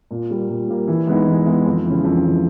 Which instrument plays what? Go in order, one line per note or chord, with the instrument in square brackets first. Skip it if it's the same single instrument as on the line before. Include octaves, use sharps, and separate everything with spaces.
[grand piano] A#2
G3 A#3
A#2
G3 A#3
E3
G#3 B3 D#4
E3
G#3 B3 D#4
F2
C#3 E3
F2
C#3 E3